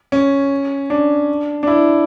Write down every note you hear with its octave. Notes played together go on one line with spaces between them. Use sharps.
C#4
D4
D4
E4